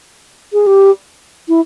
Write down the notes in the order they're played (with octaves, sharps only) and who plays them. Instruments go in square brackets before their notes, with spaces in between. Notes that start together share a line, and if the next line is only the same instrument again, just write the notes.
[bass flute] G#4
G4
E4